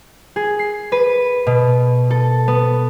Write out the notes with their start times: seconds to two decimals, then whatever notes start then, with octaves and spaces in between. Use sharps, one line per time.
0.36 G#4
0.59 C7
0.92 B4
1.47 B2
2.11 A4
2.48 B3